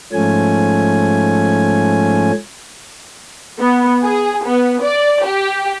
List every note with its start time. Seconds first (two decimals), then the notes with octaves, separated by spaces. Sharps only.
0.13 G#2 F3 A3 C#4 G#5
3.59 B3
4.03 G#4
4.46 B3
4.83 D5
5.25 G4